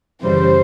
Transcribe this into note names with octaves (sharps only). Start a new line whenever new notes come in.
F#2 C#3 E3 G3 C5